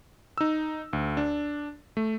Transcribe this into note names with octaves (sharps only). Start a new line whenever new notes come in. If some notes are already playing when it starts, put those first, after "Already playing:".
D#4 E6
D2
D4
A3